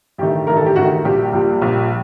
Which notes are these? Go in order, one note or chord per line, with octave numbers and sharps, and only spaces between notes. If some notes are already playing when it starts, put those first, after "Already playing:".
A1 G2 D#3 A3 G4
A1 G2 D#3 A3 A#4
A4
G4
A1 G2 D#3 A3 F#4
A#1 A#2 G3 G4
A#1 A#2 G3
A#1 A#2 G3